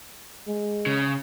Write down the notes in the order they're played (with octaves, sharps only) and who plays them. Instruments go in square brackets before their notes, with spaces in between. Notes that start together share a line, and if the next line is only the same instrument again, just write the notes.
[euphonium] G#3
[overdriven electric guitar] C#3